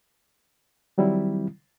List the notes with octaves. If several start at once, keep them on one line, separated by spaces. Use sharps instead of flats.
D#3 F#3 G3 C4 E4